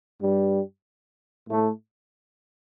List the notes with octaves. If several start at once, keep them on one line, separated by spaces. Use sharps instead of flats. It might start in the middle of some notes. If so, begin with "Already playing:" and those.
G2 G3
A2 A3